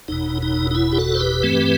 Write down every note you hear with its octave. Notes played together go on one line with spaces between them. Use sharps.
F#1 E2 B2 D#4
D#4
D#4
E4
G4
F#4 A4
C5
G4 B4
G2 E3 A3 C4